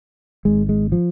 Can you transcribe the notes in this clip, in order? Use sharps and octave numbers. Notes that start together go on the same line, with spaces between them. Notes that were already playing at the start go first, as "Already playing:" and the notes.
G#1 G#2 G#3
G#3
F3